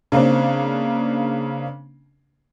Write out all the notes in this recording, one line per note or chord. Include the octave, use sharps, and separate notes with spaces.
C#3 A#3 C4 D4